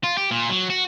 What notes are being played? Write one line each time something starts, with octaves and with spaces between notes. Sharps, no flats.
F4
G4
A#2
F#3
F#4